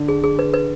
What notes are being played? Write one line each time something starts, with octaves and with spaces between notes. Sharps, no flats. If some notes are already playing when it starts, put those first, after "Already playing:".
Already playing: D3
G#4
G#4
B4
B4